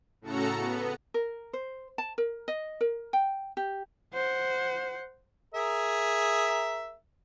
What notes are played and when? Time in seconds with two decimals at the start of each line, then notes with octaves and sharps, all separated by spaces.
0.21 A2 C#3 F#4 A4 A#5 C#7
0.57 B3
1.14 A#4
1.53 C5
1.98 A5
2.18 A#4
2.48 D#5
2.81 A#4
3.13 G5
3.57 G4
4.14 C5 F#5
5.54 G#4 A#4 E5